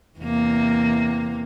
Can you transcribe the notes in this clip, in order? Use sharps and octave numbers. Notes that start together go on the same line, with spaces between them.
E2 C3 A#3